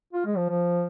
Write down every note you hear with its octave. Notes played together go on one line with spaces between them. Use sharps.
F4
G#3
F3
F3